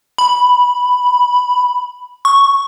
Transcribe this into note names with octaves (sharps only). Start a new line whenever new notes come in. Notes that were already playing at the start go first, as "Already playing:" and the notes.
B5
C#6